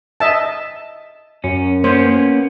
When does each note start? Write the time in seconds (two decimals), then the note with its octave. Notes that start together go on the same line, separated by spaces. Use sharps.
0.20 D#5 E5 A5
1.44 F#2 C#4
1.84 A#3 B3 C#4 C5